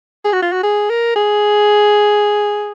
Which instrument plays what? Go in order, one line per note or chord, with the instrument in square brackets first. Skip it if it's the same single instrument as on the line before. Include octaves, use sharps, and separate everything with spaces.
[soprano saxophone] G#4
F#4
F4
F#4
G#4
A#4
G#4